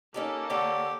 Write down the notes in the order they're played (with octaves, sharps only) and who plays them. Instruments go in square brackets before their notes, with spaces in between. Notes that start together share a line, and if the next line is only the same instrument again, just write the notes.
[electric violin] A#3 A4 [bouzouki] C#4 D#4 G4
[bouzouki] D3 C#5 [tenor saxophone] G4